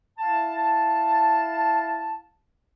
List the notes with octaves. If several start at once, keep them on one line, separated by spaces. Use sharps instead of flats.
E4 F5 A5